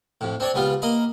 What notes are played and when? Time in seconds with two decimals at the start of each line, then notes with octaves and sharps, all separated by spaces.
0.21 F2 A2
0.40 C4 D4 C#5 D5
0.54 C#2 G3 B3 F4
0.82 A#3 D#5 A#5 B5